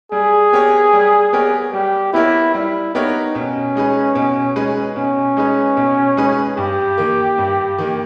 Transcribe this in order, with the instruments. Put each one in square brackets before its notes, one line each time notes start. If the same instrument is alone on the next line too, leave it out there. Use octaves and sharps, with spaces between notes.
[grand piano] G3 [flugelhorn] G#4
[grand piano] B3 G4 A#4 C#5
G3
B3 G4 A#4 C#5
[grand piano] G3 [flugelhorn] G4
[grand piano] B3 G4 A#4 C#5 [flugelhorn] E4
[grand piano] G3 [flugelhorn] E4
[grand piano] B3 G4 A#4 C#5 [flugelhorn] D#4
[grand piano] B2 [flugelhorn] C#4
[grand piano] G#3 D#4 G#4 B4
B2
G#3 D#4 G#4 B4
[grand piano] B2 [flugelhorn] C#4
[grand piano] G#3 D#4 G#4 B4
B2
G#3 D#4 G#4 B4
[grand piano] G2 [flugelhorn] G4
[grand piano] D#3 A#3
G2
D#3 A#3